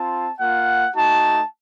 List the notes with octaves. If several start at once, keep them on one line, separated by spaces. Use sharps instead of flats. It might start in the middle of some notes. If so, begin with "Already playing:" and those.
Already playing: C4 F4 A5
A#3 F4 F#5
A3 D#4 F#4 A5